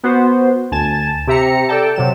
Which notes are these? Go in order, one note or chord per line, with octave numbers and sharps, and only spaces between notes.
B3 F#4 C5
D2 G#5 A5 E7
C3 G4 E5 A#5 C#7
A4 D5 G5 A5
C3 F#3 E7